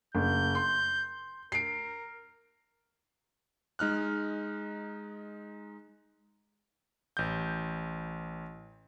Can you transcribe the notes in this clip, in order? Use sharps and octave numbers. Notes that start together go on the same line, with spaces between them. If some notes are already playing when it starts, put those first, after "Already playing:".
F#1 G6
C6
A#4 C7 D7
G#3 D#4 F6 F#6
A1 G6